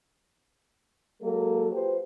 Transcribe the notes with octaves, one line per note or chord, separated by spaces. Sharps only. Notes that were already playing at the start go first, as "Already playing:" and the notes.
F#3 G#3 A#3 A4
F4 G4 B4 C5